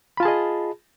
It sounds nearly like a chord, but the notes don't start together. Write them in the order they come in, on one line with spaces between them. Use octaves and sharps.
B5 F4 A5 G#4 D#5